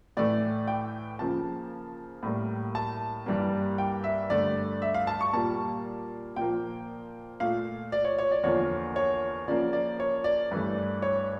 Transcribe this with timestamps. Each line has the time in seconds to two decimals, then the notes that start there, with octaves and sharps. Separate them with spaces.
0.17 A2 E3 A3 D5
0.67 G5
1.19 C#3 F3 A#3 A5
2.23 A2 G3 A#3
2.75 A5
3.26 G2 E3 G3 A#3
3.78 G5
4.04 E5
4.30 G2 D3 A3 D5
4.82 E5
4.94 F5
5.07 A5
5.21 C#6
5.33 A#2 G3 A#3 A5
6.36 A#2 F3 A#3 G5
7.40 A#2 A3 F5
7.92 D5
8.04 C#5
8.19 C#5
8.32 D5
8.43 E2 D3 F3 A#3 C#5
8.96 C#5
9.48 C#3 F3 A#3 D5
9.73 D5
10.00 C#5
10.24 D5
10.51 G2 E3 A3
11.02 C#5